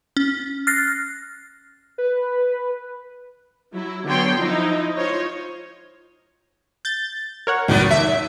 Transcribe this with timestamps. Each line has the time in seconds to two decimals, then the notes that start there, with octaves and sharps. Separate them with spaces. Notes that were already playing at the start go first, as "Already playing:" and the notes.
0.17 C#4
0.67 F6 F#6 A6 A#6 C7
1.98 B4
3.74 F#3 E4
4.05 D3 F#3 B3 C#5 G5 C6
4.38 F3 D#4 E4
4.97 D#4 F4 C5 C#5
6.85 G6 A6
7.47 A#4 C#5 F#5
7.68 C#2 F#2 A2 D#3 F#3 B3
7.89 D#2 E5